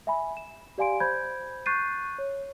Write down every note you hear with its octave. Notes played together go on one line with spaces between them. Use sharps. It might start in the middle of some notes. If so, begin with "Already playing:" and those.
E5 G#5 B5
E7
G4 D5 F5 G#5 C6 D7
C5 B5 G6 G#6
C#6 F#6 G6 A6 C7 D#7
C#5